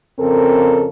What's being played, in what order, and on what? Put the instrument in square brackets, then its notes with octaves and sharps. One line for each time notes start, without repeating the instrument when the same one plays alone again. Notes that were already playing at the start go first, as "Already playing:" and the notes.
[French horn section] F2 C#3 C4 A4 A#4